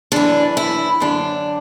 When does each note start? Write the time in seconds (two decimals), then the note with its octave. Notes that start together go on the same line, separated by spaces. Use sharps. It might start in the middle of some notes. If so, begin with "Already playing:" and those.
0.12 F#2 E3 D4
0.57 E4
1.00 F#2 D3 D4